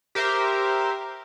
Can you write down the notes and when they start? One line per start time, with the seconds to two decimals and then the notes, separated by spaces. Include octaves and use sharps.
0.15 G4 A#4 C5 E5